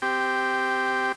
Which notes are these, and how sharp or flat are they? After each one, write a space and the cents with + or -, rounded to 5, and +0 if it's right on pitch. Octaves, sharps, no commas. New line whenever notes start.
C4 -15 G4 +0